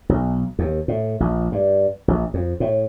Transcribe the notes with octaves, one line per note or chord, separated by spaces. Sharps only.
B1
D#2
A2
A#1
G2
A#1
F2
A2